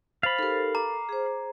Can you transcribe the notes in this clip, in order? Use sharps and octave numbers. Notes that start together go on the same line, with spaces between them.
C5 F5 B5 A6
D#4 G4 A4 A#4
A#5 D6
G#4 C5